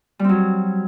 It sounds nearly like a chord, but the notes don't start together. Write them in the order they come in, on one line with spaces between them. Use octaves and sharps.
G3 C4 F#3